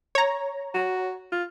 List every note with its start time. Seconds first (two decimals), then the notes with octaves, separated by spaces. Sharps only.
0.15 C#5 A#5
0.75 F#4
1.32 F4